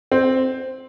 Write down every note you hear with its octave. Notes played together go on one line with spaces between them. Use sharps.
C4